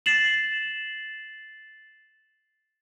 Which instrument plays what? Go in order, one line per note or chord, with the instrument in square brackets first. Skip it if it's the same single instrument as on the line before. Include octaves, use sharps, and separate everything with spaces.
[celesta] A6 C7 E7 F#7